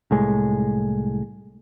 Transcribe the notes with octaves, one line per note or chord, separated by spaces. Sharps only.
C2 A2 G#3